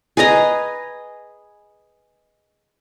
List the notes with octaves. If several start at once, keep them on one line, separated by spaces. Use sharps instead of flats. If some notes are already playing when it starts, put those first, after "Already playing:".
G#4 B4 D#5 A#5